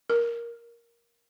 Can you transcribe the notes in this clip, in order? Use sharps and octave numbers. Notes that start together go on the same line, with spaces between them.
A#4